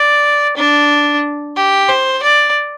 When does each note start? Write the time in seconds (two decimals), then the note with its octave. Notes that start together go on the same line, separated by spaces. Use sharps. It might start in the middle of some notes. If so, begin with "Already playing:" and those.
Already playing: D5
0.57 D4
1.56 G4
1.89 C5
2.23 D5